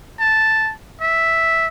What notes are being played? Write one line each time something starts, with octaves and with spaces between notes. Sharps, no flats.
A5
E5